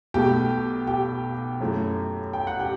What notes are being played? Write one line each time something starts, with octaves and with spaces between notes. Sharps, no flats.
B1 B2 A3 G4 G5
G4 G5
F#2 E3 A3
G5
F#5
G4 G5